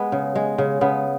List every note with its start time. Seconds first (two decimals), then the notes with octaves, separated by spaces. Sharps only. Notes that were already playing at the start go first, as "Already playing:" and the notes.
Already playing: G#3 B3
0.12 C#3
0.35 G#3
0.58 C#3
0.81 C#3 B3